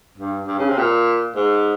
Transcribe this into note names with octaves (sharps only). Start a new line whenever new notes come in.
G2
G2
C#3
C3
A#2
G#2